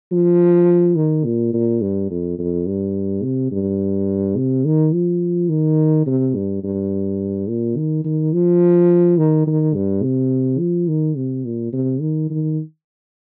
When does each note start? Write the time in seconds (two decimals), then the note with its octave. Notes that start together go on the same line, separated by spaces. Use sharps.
0.12 F3
0.96 D#3
1.25 A#2
1.53 A#2
1.81 G2
2.10 F2
2.39 F2
2.67 G2
3.23 C3
3.51 G2
4.37 C3
4.65 D#3
4.93 F3
5.49 D#3
6.06 C3
6.35 G2
6.64 G2
7.48 A#2
7.77 D#3
8.04 D#3
8.33 F3
9.18 D#3
9.47 D#3
9.74 G2
10.03 C3
10.59 F3
10.88 D#3
11.17 C3
11.45 A#2
11.73 C3
12.00 D#3
12.30 D#3